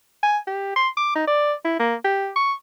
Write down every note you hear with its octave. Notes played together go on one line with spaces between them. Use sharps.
G#5
G4
C6
D6
D#4
D5
E4
A#3
G4
C#6